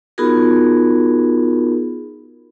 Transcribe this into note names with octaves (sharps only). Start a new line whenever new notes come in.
B3 D#4 F4 F#4 G#4 A#4